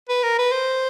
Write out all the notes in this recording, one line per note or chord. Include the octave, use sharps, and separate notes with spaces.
B4
A#4
B4
C5